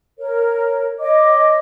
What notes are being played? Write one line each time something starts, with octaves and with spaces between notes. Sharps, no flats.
A#4 C#5
C#5 D#5 D6